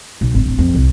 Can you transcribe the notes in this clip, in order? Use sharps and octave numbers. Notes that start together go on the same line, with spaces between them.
B1
G#1
D1
F2
C2